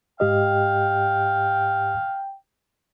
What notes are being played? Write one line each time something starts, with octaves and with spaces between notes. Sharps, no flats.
G#2 G4 D#5 F5 G5